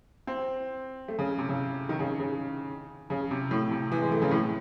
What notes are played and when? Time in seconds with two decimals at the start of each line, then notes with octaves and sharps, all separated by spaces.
0.27 C4
1.08 A3
1.19 C#3
1.38 C3
1.49 C#3
1.89 D#3
1.99 C#3
2.19 C#3
3.10 C#3
3.31 C3
3.51 A2
3.71 C3
3.92 E3
4.01 G#3
4.12 A3
4.22 C#3
4.31 A2